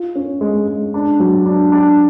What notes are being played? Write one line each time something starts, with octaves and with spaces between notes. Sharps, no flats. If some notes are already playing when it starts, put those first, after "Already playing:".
Already playing: F4
C#4
G#3
G#3
D4
F#3
D4
D4